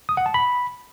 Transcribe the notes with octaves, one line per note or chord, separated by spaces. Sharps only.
D#6
F#5
A5
B5